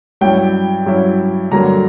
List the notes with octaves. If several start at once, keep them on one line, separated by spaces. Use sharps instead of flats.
G2 F#3 C#4 E4 G5
G2 F#3 C#4 E4
G2 D3 F#3 A#3 A#5